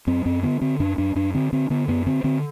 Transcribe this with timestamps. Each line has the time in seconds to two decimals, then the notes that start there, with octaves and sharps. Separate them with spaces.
0.07 F#2 C4
0.26 F#2 C4
0.43 D3 B3
0.61 D3 C4
0.80 F#2 D4
0.98 F#2 D4
1.15 F#2 D4
1.35 D3 C4
1.53 D3 C4
1.70 D3 B3
1.88 F#2 B3
2.06 D3 C4
2.24 D3 C4